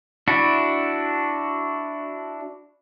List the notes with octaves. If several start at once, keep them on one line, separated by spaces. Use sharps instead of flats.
D4 E4 F#4